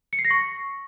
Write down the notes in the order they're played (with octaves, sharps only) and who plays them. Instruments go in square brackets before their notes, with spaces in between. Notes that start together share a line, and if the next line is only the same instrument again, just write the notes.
[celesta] C#7
C7
A#6
C#6